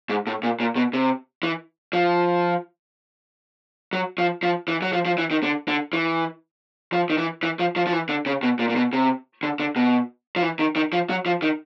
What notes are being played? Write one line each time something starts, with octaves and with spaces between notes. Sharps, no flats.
G#2
A2
A#2
A#2
B2
C3
E3
F3
F#3
F3
F3
E3
F#3
F3
F3
E3
D#3
D3
D3
E3
F3
D#3
E3
E3
F3
F3
F3
E3
D3
C#3
B2
A#2
A#2
B2
C3
D3
D3
B2
F3
E3
D#3
D#3
F3
F#3
F3
D#3